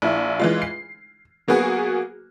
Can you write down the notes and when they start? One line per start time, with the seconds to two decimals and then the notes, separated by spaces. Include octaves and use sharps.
0.02 A#1 E4
0.39 E3 G#3 F4
0.62 C7
1.48 F#3 A#3 B3 F#4 G#4